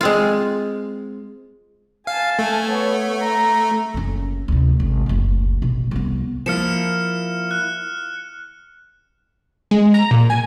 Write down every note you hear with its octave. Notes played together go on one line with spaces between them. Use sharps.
G#3 C4 F4
F5 G#5 A5
A3
B3 C#5
A#5
F#1 C#4
D2 C3
G#1
F#1 D2
A1 B2
C2 B3
F3 A#3 E4 F6 C#7 E7
F#6
G#3
A#5
A#2
G#5